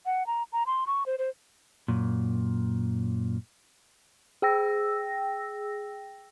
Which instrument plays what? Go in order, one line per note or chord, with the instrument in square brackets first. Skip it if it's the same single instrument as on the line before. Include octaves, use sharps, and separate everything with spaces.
[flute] F#5
A#5
A#5
C6
C#6
C5
C5
[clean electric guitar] F#2 A#2
[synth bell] G#4 G5 E6 A#6